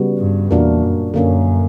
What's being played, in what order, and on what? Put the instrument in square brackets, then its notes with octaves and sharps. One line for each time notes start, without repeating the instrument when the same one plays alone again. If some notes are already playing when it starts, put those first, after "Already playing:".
Already playing: [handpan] C#3 G3 B3 F#4
[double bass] G2
[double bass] E2 [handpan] A#2 A#3 D4 F#4 A#4
[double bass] F#2
[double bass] F#2 [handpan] D3 A#3 C#4